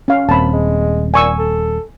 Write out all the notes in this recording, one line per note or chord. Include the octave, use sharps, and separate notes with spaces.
C#4 F5
D#1 F#2 C4 A5 B5
G#3
A#2 G#5 C#6 E6
A4